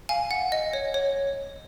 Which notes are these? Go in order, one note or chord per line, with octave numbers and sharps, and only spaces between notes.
F5 G#5
F#5
D#5
C#5
C#5